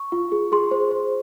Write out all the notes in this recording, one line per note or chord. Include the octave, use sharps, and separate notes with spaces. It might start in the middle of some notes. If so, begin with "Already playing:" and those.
Already playing: C#6
F4
G#4
G#4 C6
C5
C5